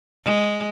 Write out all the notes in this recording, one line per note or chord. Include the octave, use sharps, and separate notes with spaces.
G#3